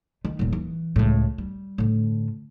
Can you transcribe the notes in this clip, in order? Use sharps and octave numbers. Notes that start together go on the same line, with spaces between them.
D#3
D#1 A#2
E3
C#2 A2
G3
A2 D3